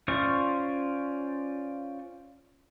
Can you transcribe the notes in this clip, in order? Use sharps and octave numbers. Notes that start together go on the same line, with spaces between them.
C#4 F4 C5 D5 C#6